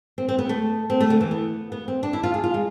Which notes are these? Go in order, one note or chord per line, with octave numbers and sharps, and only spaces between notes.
C4
C4
B3
A3
C4
A3
D3
E3
B3
B3
C4
D4
E4
F4
G#4
F4
G#3